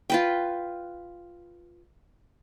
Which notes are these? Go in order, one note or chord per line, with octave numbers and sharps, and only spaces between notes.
F4 B4 G5